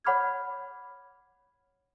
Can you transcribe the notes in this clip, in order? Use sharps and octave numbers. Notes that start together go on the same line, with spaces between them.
C#5 F#5 B5 D6 F6 G#6